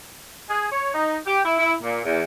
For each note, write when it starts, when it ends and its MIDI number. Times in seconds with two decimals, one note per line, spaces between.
0.50 0.68 68
0.71 0.92 73
0.94 1.15 63
1.27 1.40 67
1.45 1.56 64
1.58 1.73 64
1.83 1.99 46
2.05 2.22 40